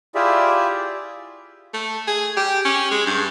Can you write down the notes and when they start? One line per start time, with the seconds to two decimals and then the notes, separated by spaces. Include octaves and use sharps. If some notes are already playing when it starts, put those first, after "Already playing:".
0.15 E4 F4 G4 G#4 D5 E5
1.73 A3
2.07 G#4
2.37 G4
2.65 C#4
2.91 G#3
3.06 G2